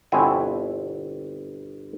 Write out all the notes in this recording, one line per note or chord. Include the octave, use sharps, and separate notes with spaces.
G1 B2 C4 E4 F#5 G#5